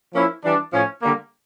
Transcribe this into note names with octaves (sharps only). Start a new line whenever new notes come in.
F3 A#3 C#4 E4
E3 G3 D4
A2 F3 C#4
D3 G3 A#3